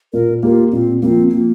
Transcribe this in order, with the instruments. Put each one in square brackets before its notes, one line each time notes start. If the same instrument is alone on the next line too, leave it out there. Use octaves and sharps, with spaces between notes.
[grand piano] A#2 [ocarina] A#4
[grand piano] A#3 G4 [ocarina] F4
[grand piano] A#2 [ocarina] C4
[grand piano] F3 A#3 [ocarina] C4
[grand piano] F3 [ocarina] A#3